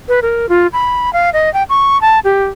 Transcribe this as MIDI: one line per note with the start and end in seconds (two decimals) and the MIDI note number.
0.08 0.20 71
0.22 0.49 70
0.49 0.67 65
0.73 1.12 83
1.13 1.30 77
1.33 1.52 75
1.54 1.63 79
1.69 2.00 85
2.01 2.19 81
2.24 2.45 67